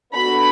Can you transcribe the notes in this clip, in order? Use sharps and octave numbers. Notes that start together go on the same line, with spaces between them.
B3 D4 F#4 A4 B5